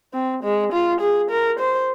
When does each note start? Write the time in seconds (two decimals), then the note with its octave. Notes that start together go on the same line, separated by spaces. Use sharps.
0.14 C4
0.43 G#3
0.73 F4
1.00 G#4
1.30 A#4
1.59 C5